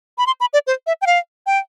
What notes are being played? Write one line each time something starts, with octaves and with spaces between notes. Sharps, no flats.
B5
C6
B5
D5
C5
E5
G5
F5
G5